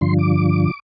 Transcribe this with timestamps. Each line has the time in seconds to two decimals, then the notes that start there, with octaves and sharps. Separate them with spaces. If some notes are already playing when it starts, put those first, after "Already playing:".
0.01 G2 D3 F3 C6
0.18 D6